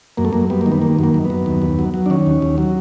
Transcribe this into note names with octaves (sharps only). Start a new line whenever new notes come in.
F#2 A#3
A3
F#2 A#3
G3 B3
D#3 A#3
B3
D#3 A#3
F#2
A#3
F#2
B3
F#2
D#2
D#2
F#3
F#3
D4
D#3 C#4
D#2
D#2
F#3